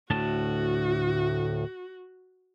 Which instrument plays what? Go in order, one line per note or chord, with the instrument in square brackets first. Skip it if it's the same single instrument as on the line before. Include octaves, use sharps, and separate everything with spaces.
[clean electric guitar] D2 A2 A5 [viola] F#4